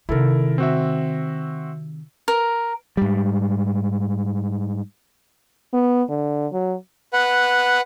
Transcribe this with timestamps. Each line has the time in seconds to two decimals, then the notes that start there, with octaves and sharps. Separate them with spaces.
0.09 C3 D#3 E4 A4 A#4
0.58 C4 F#4 E5
2.28 A#4
2.97 G#2 G3
5.73 B3
6.09 D3
6.52 F#3
7.13 B4 F#5